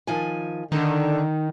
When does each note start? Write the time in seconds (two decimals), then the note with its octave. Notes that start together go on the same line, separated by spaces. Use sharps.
0.07 D#3 F3 G#5
0.72 D3 D#3 D#4